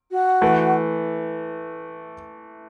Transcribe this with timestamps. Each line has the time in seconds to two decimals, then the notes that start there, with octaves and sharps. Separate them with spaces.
0.11 F#4
0.42 E3 A3